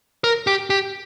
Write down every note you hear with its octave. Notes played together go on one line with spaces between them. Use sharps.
A#4
G4
G4